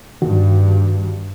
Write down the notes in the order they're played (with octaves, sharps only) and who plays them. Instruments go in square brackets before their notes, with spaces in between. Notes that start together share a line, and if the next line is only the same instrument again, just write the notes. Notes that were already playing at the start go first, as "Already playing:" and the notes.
[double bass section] G2 [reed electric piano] D#3 F#4